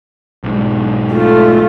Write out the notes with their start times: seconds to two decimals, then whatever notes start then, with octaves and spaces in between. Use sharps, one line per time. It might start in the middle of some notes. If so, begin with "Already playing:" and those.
0.44 B1 G#2
1.12 A3 F4